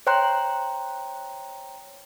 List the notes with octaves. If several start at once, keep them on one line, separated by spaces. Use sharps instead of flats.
C5 C#5 G5 A#5 C6 F#6